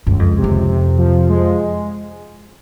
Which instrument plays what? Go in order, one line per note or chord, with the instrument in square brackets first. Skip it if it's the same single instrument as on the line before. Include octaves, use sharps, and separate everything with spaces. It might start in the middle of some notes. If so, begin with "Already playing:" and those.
[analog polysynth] C#2 [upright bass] G2
[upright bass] F2
[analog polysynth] C3
[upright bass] F2
[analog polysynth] C3
F3
G#3